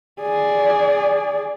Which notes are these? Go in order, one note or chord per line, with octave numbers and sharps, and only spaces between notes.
G#4 D5